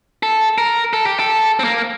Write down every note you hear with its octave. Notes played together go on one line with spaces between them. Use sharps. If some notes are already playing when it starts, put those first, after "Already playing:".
A4
A#4
A4
G4
A4
C4
A#3